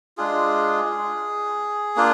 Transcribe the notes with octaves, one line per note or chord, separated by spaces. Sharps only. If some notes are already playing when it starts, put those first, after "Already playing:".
G#3 D4 F4 G#4
A#3 D4 F4